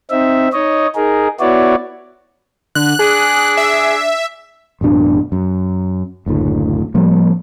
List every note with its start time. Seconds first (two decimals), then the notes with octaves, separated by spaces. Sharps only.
0.11 C4 D#4 E5
0.53 D#4 C#5 D#5
0.95 D#4 G#4 A#4
1.40 B3 E4 F#4 C#5 D5
2.75 D3 F#6
2.99 D4 G#4
3.57 E5
4.81 A1 F#2 B2 D4
5.32 F#2
6.26 F#1 D2 A2
6.94 A2 F3 G3 A#3